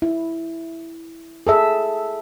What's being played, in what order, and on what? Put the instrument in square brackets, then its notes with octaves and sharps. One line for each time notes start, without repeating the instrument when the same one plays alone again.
[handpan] E4
G#4 A4 E5